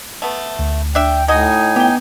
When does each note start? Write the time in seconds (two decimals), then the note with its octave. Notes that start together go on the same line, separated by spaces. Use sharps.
0.22 A3 B3
0.59 D2
0.95 D4 E5 G5
1.28 A2 D#4 F#4 D#5 G#5
1.76 B3 G4 G5